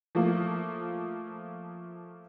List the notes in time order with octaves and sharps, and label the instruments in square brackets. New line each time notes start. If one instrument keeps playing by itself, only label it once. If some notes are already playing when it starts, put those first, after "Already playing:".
[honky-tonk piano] F3 A3 A#3